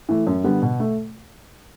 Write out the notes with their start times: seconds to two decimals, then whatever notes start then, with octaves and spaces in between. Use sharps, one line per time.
0.09 E3 A3
0.27 F#2
0.44 D3 G3 B3
0.62 B2
0.80 A3